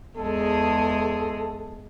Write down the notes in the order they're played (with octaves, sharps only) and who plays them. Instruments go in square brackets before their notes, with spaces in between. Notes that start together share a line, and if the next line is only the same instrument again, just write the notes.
[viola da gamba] E2 G#3 G#4 [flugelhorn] A4